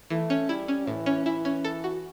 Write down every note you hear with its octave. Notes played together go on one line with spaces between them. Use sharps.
E3 A3
C#4
G3 E4
C#4
A2 E3
C#4
E3 E4
C#4
A4
F#4